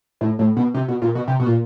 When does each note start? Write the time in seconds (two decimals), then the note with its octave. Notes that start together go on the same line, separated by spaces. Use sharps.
0.21 A2
0.39 A2
0.57 B2
0.74 C3
0.88 B2
1.02 A#2
1.15 B2
1.28 C3
1.40 B2
1.46 A#2